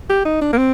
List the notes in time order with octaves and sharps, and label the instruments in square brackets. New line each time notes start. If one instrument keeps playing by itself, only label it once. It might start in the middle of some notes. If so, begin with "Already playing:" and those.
[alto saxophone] G4
D#4
D4
A#3
C4